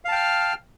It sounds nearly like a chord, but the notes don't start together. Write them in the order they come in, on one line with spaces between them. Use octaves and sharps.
F5 A5 G5 F6